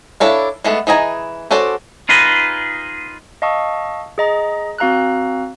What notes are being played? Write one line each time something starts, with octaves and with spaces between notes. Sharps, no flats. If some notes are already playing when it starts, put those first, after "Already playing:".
D4 E4 A4 C#5 F5
G#3 A3 B3 A4
E3 G#4 D#5 G#5 A#5
C#4 F#4 A4 C5 D5
D#4 F4 G#4 B4 D#5
D#5 F5 A5 C#6 D#6 E6
G#4 D#5 A#5
C4 F#4 F5 A#5 E6 F#6